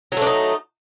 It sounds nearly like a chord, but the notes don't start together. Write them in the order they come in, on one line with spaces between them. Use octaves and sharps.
F#3 A3 D4 D#4